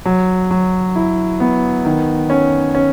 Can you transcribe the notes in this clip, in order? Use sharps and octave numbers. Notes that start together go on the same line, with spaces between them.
F#3
F#3
E4
B3
D#3
C#4
C#4